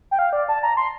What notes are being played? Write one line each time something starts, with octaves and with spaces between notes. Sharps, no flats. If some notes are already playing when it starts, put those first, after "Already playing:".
G5
F5
D5
A5
A#5
C6